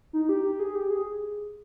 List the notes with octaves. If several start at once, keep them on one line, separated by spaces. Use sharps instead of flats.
D#4
G4
G4
G#4
G4
G#4